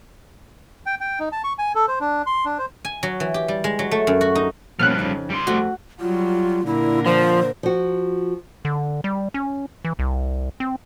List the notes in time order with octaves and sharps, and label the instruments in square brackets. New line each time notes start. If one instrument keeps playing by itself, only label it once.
[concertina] G5
G5
D#4
A5
C#6
G#5
A4
C5
D4
C6
D4
C5
[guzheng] G#5
F#3
E3
G4
G3
G#3
F#3
A3
F#2
F#4
D#4
[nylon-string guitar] B2 A#3 C#4 [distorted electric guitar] F3 G3 [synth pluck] F6 F#6
[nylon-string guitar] F2 C#3 D#4
[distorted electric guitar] G3 C6
[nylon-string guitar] F2 A3 [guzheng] F#4
[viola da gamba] F#3 G3 [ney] F4
[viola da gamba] A#2 D3 A#4 [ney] E4
[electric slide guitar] F3 [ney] C5
[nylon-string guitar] F3 F#4
[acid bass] D3
G3
C#4
E3
C2
C4